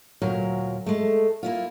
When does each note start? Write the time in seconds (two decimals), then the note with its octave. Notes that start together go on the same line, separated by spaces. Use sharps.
0.22 D2 A#2 F#3 A#4
0.86 G#3 A3
1.43 A#3 E4 F4